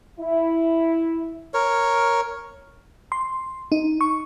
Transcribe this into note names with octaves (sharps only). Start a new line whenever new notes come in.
E4
A#4 C#5
C6
D#4
C#6